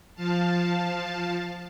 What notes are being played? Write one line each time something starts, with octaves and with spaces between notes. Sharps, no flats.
F3 F5 A5